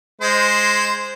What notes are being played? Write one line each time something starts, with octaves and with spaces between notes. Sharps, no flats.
G#3 C5